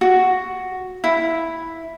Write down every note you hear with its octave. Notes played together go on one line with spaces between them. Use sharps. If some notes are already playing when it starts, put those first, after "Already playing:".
F#4
E4